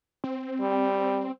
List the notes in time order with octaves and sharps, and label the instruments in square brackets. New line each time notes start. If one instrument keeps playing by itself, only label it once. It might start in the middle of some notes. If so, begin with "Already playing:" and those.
[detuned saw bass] C4
[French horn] G3